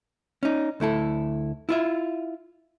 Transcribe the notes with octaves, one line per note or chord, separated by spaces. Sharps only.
C#4 D#4
D2 A3 E4 A4
E4 F4 E5